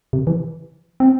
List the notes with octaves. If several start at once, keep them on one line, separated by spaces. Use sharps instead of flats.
C3
E3
C4